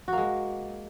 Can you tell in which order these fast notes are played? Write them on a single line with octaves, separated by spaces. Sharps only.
F#4 A#3 G#3